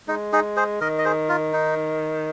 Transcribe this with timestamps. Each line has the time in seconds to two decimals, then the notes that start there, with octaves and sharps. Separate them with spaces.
0.08 G#3 D#4
0.33 D#4 G#4
0.57 G#4 C5
0.81 D#3 A#4 D#5
0.98 D#5
1.05 G#4 C5
1.29 F4 A#4
1.53 D#4